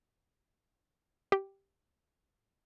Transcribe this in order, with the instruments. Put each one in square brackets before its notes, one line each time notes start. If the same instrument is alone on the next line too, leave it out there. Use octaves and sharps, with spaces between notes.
[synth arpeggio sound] G4